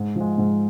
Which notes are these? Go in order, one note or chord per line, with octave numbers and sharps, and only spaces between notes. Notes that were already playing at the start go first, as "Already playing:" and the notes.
Already playing: G#2
F3 G#3
G#2